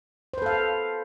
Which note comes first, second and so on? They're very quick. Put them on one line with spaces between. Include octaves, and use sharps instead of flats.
C5 B4 A4 F5